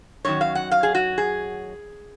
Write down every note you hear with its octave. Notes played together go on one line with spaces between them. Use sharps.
F#2 D#3 F#3 C#5
F5
F#5
F5
G#4
F#4
G#4